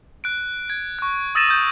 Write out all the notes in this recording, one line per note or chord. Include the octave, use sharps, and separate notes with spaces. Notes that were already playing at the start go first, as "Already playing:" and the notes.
F#6 D7
G#6
C#6 F#6
D#6 E6 A6 A#6 D#7 E7
D#6 G6